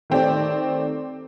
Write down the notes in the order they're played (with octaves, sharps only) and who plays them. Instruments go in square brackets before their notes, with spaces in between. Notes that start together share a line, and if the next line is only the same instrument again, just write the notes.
[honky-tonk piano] D#3 A3 C4 G4 D5